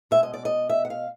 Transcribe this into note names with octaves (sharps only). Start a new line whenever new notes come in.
B2 G#3 E5
D#5
D5
D#5
E5
F#5
F5